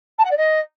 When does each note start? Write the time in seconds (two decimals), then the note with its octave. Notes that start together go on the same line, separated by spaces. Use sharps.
0.18 A5
0.25 F#5
0.31 D5
0.37 D#5